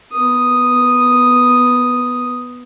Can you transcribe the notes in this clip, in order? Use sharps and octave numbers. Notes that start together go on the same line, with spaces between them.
B3 D#6